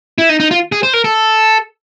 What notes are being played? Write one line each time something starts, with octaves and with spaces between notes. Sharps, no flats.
E4
D#4
D#4
F4
G#4
C5
A#4
A4